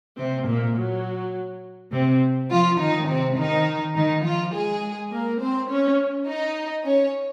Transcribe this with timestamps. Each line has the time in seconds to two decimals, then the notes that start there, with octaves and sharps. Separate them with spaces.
0.18 C3 C4
0.47 A#2 A#3
0.77 F#3
1.92 C3 C4
2.51 F3 F4
2.80 D#3 D#4
3.08 C3 C4
3.38 D#3 D#4
3.95 D#3 D#4
4.24 F3 F4
4.53 G#3 G#4
5.11 A#3 A#4
5.40 C4 C5
5.70 C#4 C#5
6.28 D#4 D#5
6.85 C#4 C#5